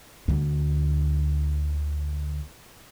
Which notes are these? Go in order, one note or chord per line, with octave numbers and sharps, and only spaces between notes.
D2 D3